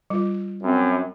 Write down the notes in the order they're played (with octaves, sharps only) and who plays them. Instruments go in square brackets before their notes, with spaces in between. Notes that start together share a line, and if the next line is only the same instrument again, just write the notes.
[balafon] G3 F4
[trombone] F#2 [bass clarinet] C4